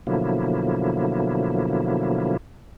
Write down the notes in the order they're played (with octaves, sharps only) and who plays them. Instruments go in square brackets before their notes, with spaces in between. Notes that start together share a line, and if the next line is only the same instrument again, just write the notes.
[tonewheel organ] B2 D3 F3 F#3 A#3 E4